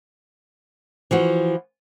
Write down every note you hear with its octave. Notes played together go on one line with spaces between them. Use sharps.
E3 F3 F#4